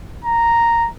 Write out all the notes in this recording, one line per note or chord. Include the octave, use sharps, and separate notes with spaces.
A#5